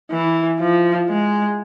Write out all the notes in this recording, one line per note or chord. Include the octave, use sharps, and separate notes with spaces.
E3
F3
G#3